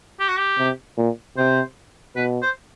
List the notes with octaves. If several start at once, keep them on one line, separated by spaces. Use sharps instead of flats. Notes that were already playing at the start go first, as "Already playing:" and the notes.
G4
F#4
G4
C3
A#2
C3 C5
B2 B4
C5